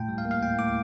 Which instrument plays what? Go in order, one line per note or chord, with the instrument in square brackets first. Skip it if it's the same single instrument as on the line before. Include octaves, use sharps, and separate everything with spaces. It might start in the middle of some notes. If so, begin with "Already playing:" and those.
Already playing: [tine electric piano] A2 G5
G3
F5
A#3
F5
A2 G5
A2 D6